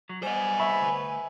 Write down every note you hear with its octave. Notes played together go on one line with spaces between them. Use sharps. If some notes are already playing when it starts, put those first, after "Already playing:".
F#3
G3 B3 C5 D#5 G#5
E5 B5 C#6
D2 B4